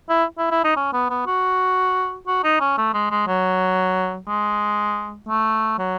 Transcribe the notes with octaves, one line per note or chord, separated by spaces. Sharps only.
E4
E4
E4
D#4
C#4
B3
B3
F#4
F#4
D#4
C#4
A3
G#3
G#3
F#3
G#3
A3
F#3